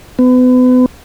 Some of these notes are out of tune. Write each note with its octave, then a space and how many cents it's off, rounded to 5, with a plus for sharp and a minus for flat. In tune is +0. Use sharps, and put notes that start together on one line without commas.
B3 +35